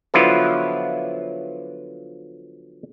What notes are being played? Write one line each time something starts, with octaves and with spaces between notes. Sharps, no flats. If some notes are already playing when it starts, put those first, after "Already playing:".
D3 F3 F#3 B3 E4 F4